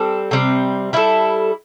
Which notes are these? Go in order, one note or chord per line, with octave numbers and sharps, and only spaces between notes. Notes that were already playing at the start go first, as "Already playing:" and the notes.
Already playing: G3 C4 A4
C3 G3 C4
G3 E4 A4